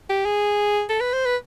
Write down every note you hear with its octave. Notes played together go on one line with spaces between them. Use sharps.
G4
G#4
A4
B4
C5
B4